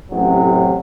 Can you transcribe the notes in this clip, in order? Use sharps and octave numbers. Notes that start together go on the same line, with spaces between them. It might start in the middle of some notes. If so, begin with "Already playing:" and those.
A1 C3 F#3